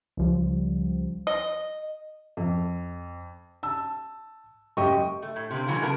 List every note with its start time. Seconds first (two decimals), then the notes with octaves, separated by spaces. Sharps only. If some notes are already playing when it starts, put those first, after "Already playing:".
0.17 C#2 F3 G3
1.27 D#5
2.37 F2
3.63 A5 E6
4.77 F#1 G4 D#5 G5 C#6
5.22 A3
5.36 A2
5.51 C3 A#3
5.67 B2 E3 F#3 G#3 A#3
5.82 C#3 B3 G#4 A#4 A5